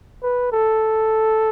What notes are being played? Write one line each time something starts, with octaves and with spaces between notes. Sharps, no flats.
B4
A4